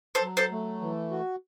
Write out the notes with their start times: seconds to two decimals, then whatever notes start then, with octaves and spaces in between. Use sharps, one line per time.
0.15 A4 C5
0.22 F#3
0.37 A4 C5
0.52 A3
0.81 E3
1.11 F#4